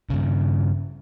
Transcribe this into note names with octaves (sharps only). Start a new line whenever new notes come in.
G2 C#3